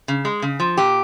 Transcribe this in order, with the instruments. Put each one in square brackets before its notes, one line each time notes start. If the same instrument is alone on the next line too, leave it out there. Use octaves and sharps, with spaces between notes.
[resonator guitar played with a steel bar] C#3
G#3
C#3
F3
A#2 G4